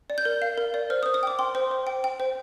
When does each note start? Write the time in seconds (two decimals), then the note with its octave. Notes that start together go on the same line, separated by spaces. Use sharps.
0.10 D5
0.18 G6
0.25 A#4
0.42 F5
0.58 A#4
0.74 D5
0.90 C5 F6
1.03 D#6
1.06 C5
1.14 D#6
1.23 G5 D6
1.39 G5 C6
1.55 C5
1.71 C5
1.87 G5
2.04 G5
2.20 C5